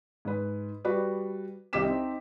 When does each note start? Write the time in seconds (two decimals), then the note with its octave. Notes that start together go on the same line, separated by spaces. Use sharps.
0.25 G#2 B4
0.85 G3 F#4 B4 D5
1.73 C2 G4 D#5 D6 B6 E7
1.85 C4 D#4